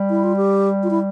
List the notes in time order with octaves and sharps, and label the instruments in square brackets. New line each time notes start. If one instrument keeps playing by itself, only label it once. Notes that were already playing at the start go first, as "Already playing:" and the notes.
Already playing: [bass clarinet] G3
[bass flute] E4
F4
G4
F4
E4